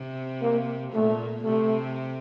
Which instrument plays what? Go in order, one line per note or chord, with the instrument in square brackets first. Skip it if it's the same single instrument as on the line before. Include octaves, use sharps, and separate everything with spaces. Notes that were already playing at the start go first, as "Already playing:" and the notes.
Already playing: [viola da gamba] C3
[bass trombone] A#3
[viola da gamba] A#2 [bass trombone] A3
[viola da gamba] C3 [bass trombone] A3